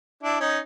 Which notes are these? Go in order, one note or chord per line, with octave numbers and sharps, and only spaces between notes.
D4 E4
C#4 D#4